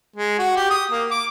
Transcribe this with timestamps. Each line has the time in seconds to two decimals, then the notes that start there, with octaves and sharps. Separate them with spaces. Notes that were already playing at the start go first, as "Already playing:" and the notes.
0.16 G#3
0.39 F#4
0.57 G4
0.70 D#6
0.91 A#3
1.11 D6